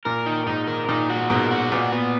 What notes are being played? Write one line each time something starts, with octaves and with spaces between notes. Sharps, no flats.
A#2 A#4
D#4
G#2 D#4
A#4
A#2 D#4
F#4
G#2 B2 A#4
F#4
A#2 B3
B3